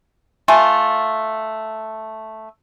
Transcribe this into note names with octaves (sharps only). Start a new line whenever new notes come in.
A3 F4 G#5